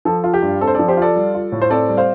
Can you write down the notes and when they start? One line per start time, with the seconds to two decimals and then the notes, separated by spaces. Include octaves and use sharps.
0.05 F3 A4
0.24 F4
0.34 G4
0.42 G2
0.61 C4 A4
0.67 C5
0.75 F3 A4 D5
0.88 G4 C5
0.97 F4 A4 D5
1.16 G3
1.34 F4
1.52 A2
1.62 C5
1.70 C4 A4 D5
1.89 G3
1.97 C5 F5